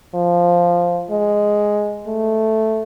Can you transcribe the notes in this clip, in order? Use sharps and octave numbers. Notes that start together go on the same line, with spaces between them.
F3
G#3
A3